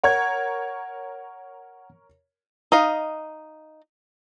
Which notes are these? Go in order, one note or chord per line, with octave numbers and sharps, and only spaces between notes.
A#4 C#5 F#5 G#6
D#4 D#5 F5